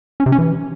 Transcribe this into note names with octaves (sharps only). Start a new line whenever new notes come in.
C#4
C3
C#4
E3